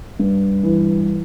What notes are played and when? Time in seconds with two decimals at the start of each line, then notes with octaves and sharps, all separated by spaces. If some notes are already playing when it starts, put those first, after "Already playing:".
0.19 G2
0.63 E3